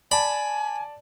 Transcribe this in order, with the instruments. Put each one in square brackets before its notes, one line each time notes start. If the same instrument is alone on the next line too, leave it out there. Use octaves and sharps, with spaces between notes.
[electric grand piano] D5 A5 [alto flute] G#5 [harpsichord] B5